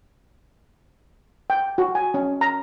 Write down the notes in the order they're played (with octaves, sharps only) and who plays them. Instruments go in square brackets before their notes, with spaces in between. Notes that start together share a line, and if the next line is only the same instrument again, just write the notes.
[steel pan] G5
F#4
G#5
C#4
A#5